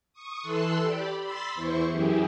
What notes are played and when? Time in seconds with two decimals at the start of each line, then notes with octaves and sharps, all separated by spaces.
0.13 C#6 D#6
0.42 E3 A4 C6 E6 F#6
0.80 G4 D5 B5
1.21 B5 C6 E6 A6 B6
1.55 E2 E3 E4 C5 C#6
1.91 F#2 E3 E4 G4 G#4